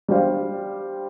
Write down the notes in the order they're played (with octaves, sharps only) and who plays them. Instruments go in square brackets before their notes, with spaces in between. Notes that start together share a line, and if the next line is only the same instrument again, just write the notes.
[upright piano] G3 D4 G4 C5 F5